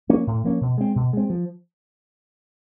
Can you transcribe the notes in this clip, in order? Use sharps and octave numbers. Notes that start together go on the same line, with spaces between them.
F3 A#3 C#4
A2
F3 A#3 C#4
B2
G#3 C4
B2
G#3 C4
F3